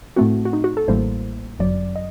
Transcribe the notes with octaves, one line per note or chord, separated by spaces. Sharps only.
A2 A3 C4 F#4
F#4
D#4
F#4
A4
A1 A2 G3 A#3 C5
G1 F#2 F#3 D5
D#5